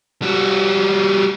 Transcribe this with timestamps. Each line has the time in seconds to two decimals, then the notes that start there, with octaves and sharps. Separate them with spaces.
0.22 G3 F#4